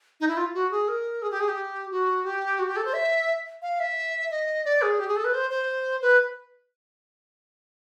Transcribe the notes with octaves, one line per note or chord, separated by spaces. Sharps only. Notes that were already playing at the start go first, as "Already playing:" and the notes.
D#4
E4
F4
F#4
G#4
A#4
G#4
G4
G#4
G4
F#4
G4
F#4
G4
A4
C5
E5
F5
E5
D#5
D5
G#4
G4
G#4
A4
B4
C5
C5
B4